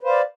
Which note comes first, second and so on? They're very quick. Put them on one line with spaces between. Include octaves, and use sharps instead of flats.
B4 C5 F5 D5